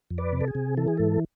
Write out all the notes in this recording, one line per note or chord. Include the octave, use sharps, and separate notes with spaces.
F2
B4 D5
C3
A4
G#4
C3
E3 A4
G#4
G#2 A4